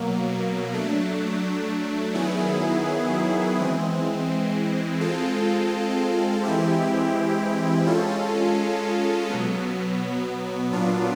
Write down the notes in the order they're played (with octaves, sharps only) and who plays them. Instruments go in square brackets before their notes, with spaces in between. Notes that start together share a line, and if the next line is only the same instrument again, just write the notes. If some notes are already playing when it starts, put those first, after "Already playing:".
Already playing: [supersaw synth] B2 F#3 A#3
F#3 A3 D4
D#3 F#3 B3 E4 G#4
E3 G#3 C4
G#3 C4 F4 A4
E3 G#3 C4 E4 G4
G#3 C#4 F4 A4
B2 F#3 B3
A#2 F#3 B3 D4 F4